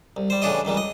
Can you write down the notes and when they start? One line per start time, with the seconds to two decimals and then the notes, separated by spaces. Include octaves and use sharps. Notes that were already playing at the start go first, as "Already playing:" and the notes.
0.16 C2
0.30 G3 C5
0.42 A2 C#3 E3 D4 G4 D#5
0.65 C#2 D#3 E3 G3
0.77 D#5